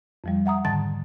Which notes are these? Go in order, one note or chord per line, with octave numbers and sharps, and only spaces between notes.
F2 F3 G3
E5 F#5 A#5 D#6
G#2 D3 D#3 A5 A6